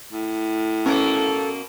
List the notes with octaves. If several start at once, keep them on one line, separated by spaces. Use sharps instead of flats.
A2
B2 A#3 C#4 A4 A#4